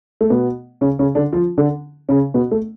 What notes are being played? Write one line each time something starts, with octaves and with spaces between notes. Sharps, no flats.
A3
B2 B3
C#3 C#4
C#3 C#4
D3 D4
F3 F4
D3 D4
C#3 C#4
B2 B3
A3